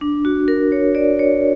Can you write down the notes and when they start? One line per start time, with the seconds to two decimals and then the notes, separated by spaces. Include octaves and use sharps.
0.01 D4
0.25 F#4
0.48 A#4
0.72 C#5
0.95 D5
1.19 C#5